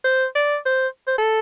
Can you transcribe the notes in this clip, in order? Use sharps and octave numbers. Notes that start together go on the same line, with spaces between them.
C5
D5
C5
C5
A4